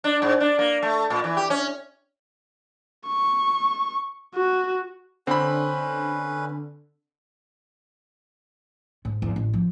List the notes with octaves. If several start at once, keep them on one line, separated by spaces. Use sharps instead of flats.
D4
G#2
D4
A#3
A3
A#2
E3
G4
C#4
C#6
F#4
D3 C4 C#4 B4 B5
G#2
E2
A1
F3